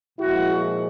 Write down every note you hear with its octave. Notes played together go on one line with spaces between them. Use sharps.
A#2 F3 G#3 E4 F#4